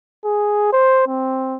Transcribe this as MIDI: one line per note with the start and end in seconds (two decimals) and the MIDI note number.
0.24 0.71 68
0.73 1.05 72
1.07 1.58 60